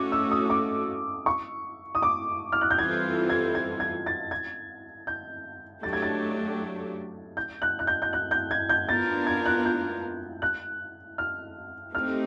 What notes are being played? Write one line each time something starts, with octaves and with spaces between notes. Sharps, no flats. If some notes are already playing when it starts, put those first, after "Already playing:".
Already playing: A3 C#4 F#4 A4 D6
E6
D#6
D6
C#6
D#6
D6
F6
F#6
G6
E3 G3 C4 F4 A4 G#6
G#6
G#6
G#6
A6
G#6
G6
F#3 A3 D4 G4 A6
G#6
A6
G6
F#6
F#6
G6
G6
F#6
G6
G#6
G6
B3 D4 F4 A#4 A6
G#6
F#6
G6
F#6
F6
A3 C4 D#4 G4 F6